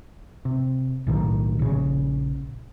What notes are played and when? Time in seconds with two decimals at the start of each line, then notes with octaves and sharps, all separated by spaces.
0.45 C3
1.07 B1 A2 D#3
1.59 A#1 C#3